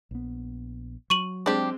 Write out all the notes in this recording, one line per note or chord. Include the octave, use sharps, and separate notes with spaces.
A#1 B3
F#3 C#6 D#7 F#7
G#3 C4 D4 G4